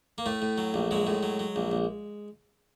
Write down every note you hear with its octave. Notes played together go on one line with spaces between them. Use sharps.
A#3
A2 A3
A2
F#3
A#1
F#3 G#3
A2
F#3
F#3
A#1
A#1